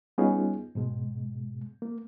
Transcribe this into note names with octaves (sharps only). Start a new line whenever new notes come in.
G3 B3 C#4 D#4 F4 G#4
G#2 B2 G#3
A#3